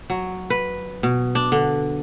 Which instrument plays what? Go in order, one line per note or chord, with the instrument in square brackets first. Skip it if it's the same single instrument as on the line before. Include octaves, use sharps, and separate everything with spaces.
[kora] F#3
B4
B2
D4
D3